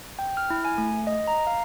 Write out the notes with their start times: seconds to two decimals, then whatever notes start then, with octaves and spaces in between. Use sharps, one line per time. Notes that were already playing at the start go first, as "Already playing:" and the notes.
0.19 G5
0.37 F6
0.50 E4
0.65 G#5
0.78 A3
1.07 D#5
1.28 A#5
1.47 F5